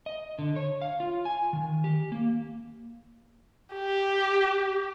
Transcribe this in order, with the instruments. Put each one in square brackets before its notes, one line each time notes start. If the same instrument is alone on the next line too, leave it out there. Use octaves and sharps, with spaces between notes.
[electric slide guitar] D#5
D3
C#5
F5
F4
G#5
D#3
G4
A#3
[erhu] G4